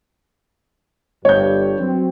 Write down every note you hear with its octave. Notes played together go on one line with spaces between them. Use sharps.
G1 G2 C#5 G6
F#3 C4